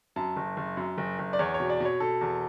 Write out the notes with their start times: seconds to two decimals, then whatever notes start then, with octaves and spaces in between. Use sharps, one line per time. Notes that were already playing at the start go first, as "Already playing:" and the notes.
0.16 F#2 A5
0.36 F#1
0.57 F#1
0.77 F#2
0.98 F#1
1.19 F#1
1.33 D5
1.39 E2 C#5
1.54 C#5
1.60 B2
1.70 D5
1.80 B2 C#5
2.00 B2 A4
2.21 E2